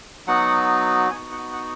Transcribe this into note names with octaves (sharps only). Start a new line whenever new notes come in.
F#3 B3 D#4 F#4 F#5
B3 D#4 F#4 G#5
F#5
F#5